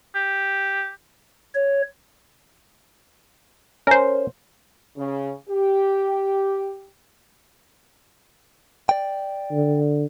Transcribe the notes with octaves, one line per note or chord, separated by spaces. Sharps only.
G4
C#5
C#4 A#4 C5
C#3
G4
D5 G5
D3